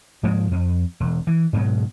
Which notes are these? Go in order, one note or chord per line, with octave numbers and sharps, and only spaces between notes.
G#2 F3 G#3 A#3
F2
E1
E3
G#2 B2 F#3